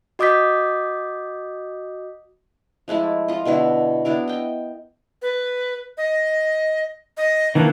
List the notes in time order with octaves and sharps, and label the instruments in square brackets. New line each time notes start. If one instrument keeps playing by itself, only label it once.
[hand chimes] F#4 D#5 D6 D#6 G6 B6
[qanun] F3 G#3 A3 E4
F4 D#5
B2 D3 E4 F#4
B3 D4 E4 A#4
D#5 G5
[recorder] B4
D#5
D#5
[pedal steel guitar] D#3 E3 A#3 [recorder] D4